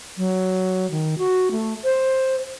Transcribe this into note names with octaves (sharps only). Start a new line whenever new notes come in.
F#3
D#3
F#4
A3
C5